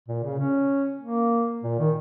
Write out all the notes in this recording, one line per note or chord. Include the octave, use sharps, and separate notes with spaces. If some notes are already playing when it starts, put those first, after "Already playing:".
A#2
C#3
C#4
A#3
A#2
D#3